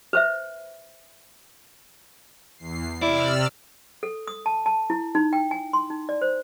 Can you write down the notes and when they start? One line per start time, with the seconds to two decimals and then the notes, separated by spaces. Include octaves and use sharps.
0.13 B4 C5 E5
2.57 E2 C7
3.02 C3 E4 D5 E6 F6
4.03 A4
4.27 D#6
4.46 A5
4.66 A5
4.90 E4
5.15 D#4
5.33 G5
5.51 G#5
5.73 C6
5.90 D#4
6.09 D5
6.22 C5